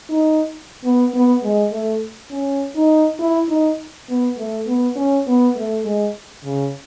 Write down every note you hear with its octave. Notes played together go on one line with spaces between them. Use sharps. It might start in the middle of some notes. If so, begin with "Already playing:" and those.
D#4
B3
B3
G#3
A3
C#4
D#4
E4
D#4
B3
A3
B3
C#4
B3
A3
G#3
C#3